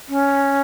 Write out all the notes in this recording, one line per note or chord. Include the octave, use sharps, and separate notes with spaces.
C#4